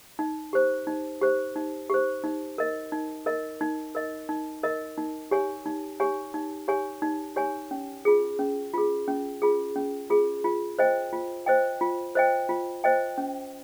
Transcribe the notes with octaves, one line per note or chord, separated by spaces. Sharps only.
D#4
G4 C5
D#4
G4 C5
D#4
G4 C5
D#4
A#4 D#5
D#4
A#4 D#5
D#4
A#4 D#5
D#4
A#4 D#5
D#4
G4 C#5 G#5
D#4
G4 C#5 G#5
D#4
G4 C#5 G#5
D#4
G4 C#5 G#5
C#4
F4 G#4
C#4
F4 G#4
C#4
F4 G#4
C#4
F4 G#4
F4
C5 D#5 G5
F4
C5 D#5 G5
F4
C5 D#5 G5
F4
C5 D#5 G5
C#4